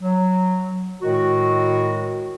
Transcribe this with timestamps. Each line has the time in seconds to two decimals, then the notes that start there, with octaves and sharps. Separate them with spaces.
0.02 F#3
1.02 A2 D#3 G#3 F#4